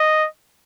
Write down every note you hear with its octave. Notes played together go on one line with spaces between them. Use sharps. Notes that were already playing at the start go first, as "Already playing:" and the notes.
Already playing: D#5